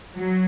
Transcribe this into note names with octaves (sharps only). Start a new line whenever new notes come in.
F#3